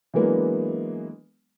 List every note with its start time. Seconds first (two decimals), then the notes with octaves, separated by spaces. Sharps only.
0.14 E3 F#3 G#3 A#3 B3 D4